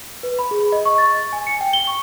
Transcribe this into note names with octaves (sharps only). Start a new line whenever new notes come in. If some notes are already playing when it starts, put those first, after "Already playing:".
B4
B5
G#4
D#5
C#6
A6
G#5
C#7
G5
G7
C#6